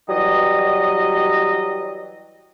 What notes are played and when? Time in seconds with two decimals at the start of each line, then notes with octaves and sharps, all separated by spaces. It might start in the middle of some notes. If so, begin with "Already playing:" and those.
0.09 E3 F#3 G3 D#5